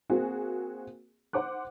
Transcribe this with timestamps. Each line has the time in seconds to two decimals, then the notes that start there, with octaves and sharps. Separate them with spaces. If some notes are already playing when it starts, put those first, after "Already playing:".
0.10 A#3 C4 F#4 G#4
1.33 C5 F#5 D6 F#6